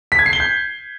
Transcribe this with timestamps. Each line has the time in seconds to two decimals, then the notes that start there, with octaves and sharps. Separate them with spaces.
0.12 B6
0.19 G#6
0.26 C7
0.33 G7
0.40 G6